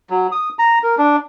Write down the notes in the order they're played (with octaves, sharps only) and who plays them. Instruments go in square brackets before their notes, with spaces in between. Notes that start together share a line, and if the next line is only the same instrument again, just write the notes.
[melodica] F#3
D#6
A#5
A#4
D4